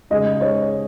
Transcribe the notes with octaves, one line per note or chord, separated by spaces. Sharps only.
C#3 G#3 D#4 D#5
C#5